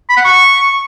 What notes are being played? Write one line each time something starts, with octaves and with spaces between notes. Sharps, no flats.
B5
F#5
C#6